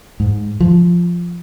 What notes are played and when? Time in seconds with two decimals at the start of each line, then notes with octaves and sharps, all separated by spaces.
0.20 G#2
0.60 F3